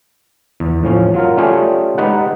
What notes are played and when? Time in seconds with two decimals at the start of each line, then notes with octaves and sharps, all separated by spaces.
0.60 E2
0.83 A2 F3 C#4
1.14 F#3 F4 A#4
1.37 G3 A3 C#4 F4 G4 G#4
1.98 G#3 D#4 G4 B4 F#5